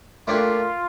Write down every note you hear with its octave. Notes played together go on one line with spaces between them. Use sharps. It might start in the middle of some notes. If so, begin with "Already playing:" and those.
A#2 A3 D4 F4 G4